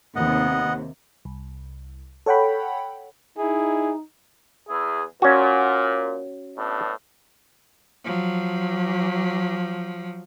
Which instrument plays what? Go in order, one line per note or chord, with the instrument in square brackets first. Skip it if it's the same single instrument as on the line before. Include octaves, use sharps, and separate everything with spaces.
[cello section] D#2 C3 [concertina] B3 D#5 F#5
[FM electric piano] C2
A4 C#5 F#5 G5 B5
[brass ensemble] D#4 [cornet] E4 [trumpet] G#4
[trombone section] E2 E4 G#4
[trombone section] A#2 [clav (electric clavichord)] C#4 F#4
[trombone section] A2 B3 D4
[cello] F3 F#3